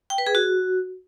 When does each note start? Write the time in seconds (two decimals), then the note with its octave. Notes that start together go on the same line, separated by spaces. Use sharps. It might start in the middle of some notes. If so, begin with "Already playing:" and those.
0.10 G5
0.18 B4
0.27 G#4
0.35 F#4